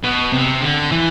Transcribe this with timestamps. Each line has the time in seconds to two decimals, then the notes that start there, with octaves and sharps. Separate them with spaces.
0.04 B2
0.33 C3
0.61 D3
0.91 E3